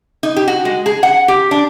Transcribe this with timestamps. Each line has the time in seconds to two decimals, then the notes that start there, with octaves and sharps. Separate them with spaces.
0.23 D#4
0.36 G4
0.48 F#4
0.65 G#3
0.86 G#4
1.03 F#5
1.28 G4
1.51 D4